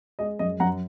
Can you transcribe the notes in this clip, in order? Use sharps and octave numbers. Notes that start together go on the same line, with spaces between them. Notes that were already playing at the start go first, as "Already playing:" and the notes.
G#3 D#5
F#2 D#5
F#2 F#5 A#5